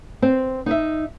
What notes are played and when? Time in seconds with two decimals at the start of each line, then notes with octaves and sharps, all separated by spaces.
0.22 C4
0.66 D#4 D#5 E5